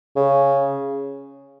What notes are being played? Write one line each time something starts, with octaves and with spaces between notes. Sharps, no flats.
C#3